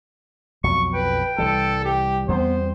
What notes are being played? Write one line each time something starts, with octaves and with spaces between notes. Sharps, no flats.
B1 F2 F#3 C#6
B4 G5
C2 E3 G3 A4
G4
E2 G3 B3 C4 C5